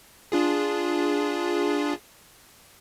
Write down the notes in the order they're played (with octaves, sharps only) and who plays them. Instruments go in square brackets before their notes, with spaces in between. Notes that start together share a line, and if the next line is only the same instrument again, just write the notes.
[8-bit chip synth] D4 F4 G#4